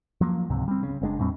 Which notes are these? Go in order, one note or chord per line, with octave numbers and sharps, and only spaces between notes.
F3 F#3 A#3
C#2 G#2 C3
G3 C4
C#3
F#1 G#3 D4
E2 A2 G3 C4